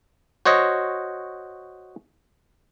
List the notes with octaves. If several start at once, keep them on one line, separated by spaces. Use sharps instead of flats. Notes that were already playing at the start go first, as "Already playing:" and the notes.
F#4 C5 C#5 D#5